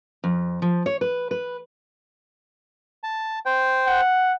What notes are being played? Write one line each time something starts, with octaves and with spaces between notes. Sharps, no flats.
F2
F3
C#5
B4
B4
A5
C5 G5
F#5